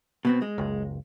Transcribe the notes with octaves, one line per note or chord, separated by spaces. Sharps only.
B2 B3 C4
G#3
F#1 C#2